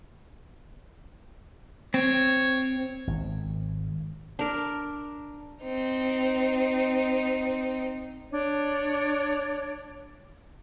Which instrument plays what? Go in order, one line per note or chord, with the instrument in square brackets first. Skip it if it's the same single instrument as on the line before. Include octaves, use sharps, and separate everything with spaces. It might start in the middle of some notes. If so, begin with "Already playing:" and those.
[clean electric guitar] C4 [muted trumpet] C#5
[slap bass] G#1
[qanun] D4 A#4
[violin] C4 D#4
[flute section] D4 C#5